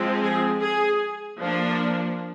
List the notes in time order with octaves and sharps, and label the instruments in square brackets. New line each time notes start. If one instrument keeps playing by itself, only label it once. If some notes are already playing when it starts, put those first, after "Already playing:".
Already playing: [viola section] F3 G#3 C4
G#4
G#4
F3 A#3 D4